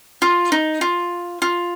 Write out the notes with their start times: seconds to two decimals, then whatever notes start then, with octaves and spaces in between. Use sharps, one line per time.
0.22 F4
0.52 D#4
0.81 F4
1.42 F4